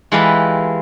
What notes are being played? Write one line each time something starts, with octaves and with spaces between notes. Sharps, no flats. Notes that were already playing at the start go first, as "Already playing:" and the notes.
E3 G#3 F4 G4 A4 B4